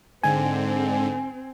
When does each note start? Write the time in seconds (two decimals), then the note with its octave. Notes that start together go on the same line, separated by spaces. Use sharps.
0.23 G#2 D3 C4 G#5